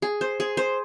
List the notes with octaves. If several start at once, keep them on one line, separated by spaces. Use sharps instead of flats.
G#4
C5
G#4
C5